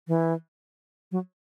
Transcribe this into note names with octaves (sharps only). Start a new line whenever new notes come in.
E3
F#3